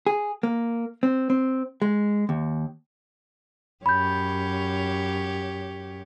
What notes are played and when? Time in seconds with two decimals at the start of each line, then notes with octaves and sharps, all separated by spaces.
0.07 G#4
0.43 A#3
1.03 C4
1.30 C4
1.82 G#3
2.29 D#2
3.86 F#2 G4 C#5 B5 G6